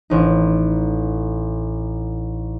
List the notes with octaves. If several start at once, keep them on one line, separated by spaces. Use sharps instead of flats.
A1 D#4